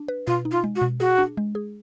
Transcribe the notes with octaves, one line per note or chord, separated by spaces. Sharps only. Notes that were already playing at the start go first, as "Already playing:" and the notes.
Already playing: D4
B4
B2 F4
D#4
F4
G#3
F#4
B2
F#4 G#4
D4
G#3
G#4